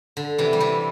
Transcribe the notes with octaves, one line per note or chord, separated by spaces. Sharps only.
D3
C3 E3
G3
C3 E3